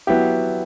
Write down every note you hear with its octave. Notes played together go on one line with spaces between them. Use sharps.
F#3 B3 E4 G4